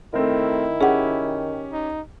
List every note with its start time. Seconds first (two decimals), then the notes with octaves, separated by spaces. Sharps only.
0.14 D#3 A3 C4 E4 A#4
0.81 C#4 G4 G#4 F#5
1.73 D#4